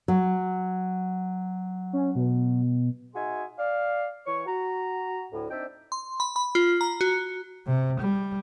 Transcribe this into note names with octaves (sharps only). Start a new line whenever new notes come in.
F#3
C#4
B2
D#4 F#4 G#4 E5 G#5 C6
D5 F5
E3 C#5 C#6
F#4 A#5
D2 A2
C4 D4 D#4 D5 E5 G5
C6
B5
B5
F4
A#5
F#4
C3
G3